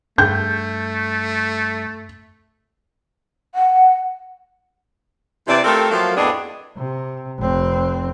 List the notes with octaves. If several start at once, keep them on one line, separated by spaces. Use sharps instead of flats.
G2 A3 G6
F#5
C3 E3 D5
A3 C4 F4 G4 A4 A#4
F3 F#3 A3 A#3
F2 A2 B3 D4 G#4 D#5
C3
F1 C4